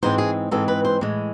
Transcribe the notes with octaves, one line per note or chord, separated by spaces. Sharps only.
G#2 E3 G#3 C4 C5
G#4
G#2 E3 G#3 C4 A4
B4
C5
A2 E3 G#3